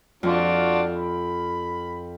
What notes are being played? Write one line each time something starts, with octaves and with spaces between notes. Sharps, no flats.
F2 D4 F4 F#4
B5